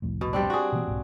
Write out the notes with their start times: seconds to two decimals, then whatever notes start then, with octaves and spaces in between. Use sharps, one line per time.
0.02 C2 F2 A2
0.21 B2
0.33 G3 C4 D4
0.50 F#4 G#4
0.72 B2 E3 A#3
0.88 B1 G#2